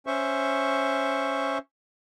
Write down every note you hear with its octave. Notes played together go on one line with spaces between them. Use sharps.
C#4 C5 E5 C#6